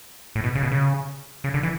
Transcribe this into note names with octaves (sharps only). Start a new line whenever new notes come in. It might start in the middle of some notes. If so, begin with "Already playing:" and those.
A2
B2
C#3
B2
C#3
C#3
D3
E3